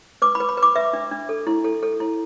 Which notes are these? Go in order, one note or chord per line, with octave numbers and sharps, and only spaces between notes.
B4 D6
B5
B4
B5
B4
D6
B4 E5
D4
D4
A4
E4
A4
A4
E4